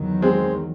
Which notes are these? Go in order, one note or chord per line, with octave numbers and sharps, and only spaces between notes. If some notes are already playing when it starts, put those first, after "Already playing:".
Already playing: E2 D#3 F#3
G#3 C4